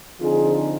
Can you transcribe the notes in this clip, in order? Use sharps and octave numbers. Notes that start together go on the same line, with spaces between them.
D3 F3 C4 D#4 F4 G#4